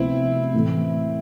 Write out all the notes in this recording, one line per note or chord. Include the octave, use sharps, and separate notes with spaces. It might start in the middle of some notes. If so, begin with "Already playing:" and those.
Already playing: D2 C3 F3 B3 C4 E4
A2 E3 A3